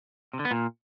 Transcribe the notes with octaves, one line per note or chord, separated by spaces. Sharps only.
C3
D3
B3
A#2